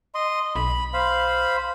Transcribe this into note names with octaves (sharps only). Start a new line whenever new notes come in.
D#5 C6
B1 B5
C5 F5 B5